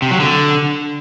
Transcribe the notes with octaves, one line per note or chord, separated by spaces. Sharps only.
C3
F#3
D3